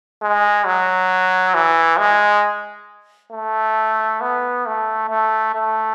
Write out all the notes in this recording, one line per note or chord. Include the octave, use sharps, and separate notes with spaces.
G#3
F#3
E3
G#3
A3
B3
A3
A3
A3